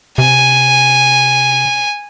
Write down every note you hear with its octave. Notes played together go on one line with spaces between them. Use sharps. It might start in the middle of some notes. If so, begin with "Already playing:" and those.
C3 G#5